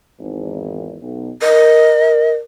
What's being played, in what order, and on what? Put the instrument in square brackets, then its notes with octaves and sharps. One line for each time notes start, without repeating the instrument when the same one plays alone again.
[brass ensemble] G#1 E2
B1
[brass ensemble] A#4 [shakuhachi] D#5